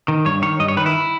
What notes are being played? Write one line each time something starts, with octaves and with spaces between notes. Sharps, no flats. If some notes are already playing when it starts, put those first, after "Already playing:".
D#3
G2 C#5
D#3 C#5
G2 D#5
C#5
D#3 B4
E4